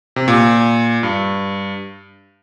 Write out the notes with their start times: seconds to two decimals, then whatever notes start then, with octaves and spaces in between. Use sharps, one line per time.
0.16 C3
0.28 A#2
1.03 G2